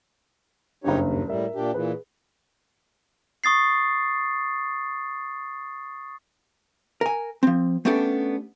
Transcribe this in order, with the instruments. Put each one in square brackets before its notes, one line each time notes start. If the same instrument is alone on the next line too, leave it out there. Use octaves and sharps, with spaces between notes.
[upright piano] F#1 G2 [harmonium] D#4 G4 C#5
[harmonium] D#2
[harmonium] A2 G3 [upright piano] A#4 E5
[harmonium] A#2 D4 G4
[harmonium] A#2 E3 [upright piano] G#4 B4
[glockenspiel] C#6 D#6 A6 C7
[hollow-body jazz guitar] A#4 G#5
F3 C4
A3 B3 C#4 D4 G4 A4